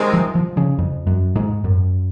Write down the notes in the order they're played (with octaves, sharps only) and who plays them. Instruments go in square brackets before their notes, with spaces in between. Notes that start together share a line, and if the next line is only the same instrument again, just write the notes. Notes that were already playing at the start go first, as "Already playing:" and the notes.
Already playing: [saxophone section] C3 D#3 G#3 C4
[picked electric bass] F3
F3
C#3
F2
F#2
G#2
F#2